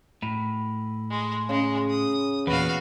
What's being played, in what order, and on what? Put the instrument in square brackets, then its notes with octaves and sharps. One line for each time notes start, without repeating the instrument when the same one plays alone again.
[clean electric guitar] A2 [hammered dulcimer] B5
[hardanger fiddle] G#3
[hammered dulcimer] C#3 [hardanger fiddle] G#3
[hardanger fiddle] D#6
[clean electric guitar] E2 A#2 [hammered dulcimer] B3 B4 [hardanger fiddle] F#4 F5